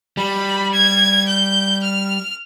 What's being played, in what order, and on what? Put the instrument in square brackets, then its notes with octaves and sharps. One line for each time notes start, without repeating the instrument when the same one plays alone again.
[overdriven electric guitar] G3 [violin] B5
[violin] G#6
G6
F6